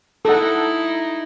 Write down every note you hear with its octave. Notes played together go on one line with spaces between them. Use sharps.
D#4 E4 A4 F#5